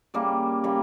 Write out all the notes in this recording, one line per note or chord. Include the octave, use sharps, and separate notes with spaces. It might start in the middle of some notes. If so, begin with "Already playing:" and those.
C#3 G3 A#3
C#3 G3 A#3